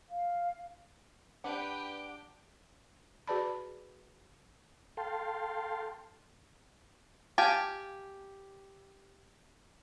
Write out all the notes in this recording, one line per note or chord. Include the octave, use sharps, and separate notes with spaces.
F5
D4 G4 B4 F#5 G5
F#4 G#4 B4 D5 A5 B5
A4 F5 G5 A5 C6
G4 F5 G#5 A5